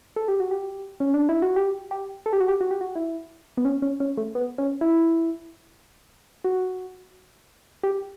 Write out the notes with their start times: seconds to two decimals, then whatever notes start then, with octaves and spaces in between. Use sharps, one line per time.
0.16 A4
0.28 G4
0.40 F#4
0.51 G4
1.00 C#4
1.14 D4
1.29 E4
1.42 F#4
1.56 G4
1.91 G4
2.26 A4
2.33 G4
2.40 F#4
2.48 G4
2.61 F#4
2.71 G4
2.81 F#4
2.95 E4
3.57 B3
3.65 C#4
3.82 C#4
4.00 C#4
4.17 A3
4.35 B3
4.58 C#4
4.81 E4
6.44 F#4
7.83 G4